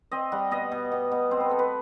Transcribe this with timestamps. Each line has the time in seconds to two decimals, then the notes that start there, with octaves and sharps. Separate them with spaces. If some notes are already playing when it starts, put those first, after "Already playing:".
0.12 C4 D#5
0.32 G3 F#5
0.51 B2 D#5
0.72 B2
0.92 B2
1.11 B2
1.31 C4 C5
1.40 B4
1.50 C4 A4
1.59 B4